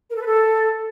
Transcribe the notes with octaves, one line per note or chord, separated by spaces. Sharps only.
A#4
A4
B4
A4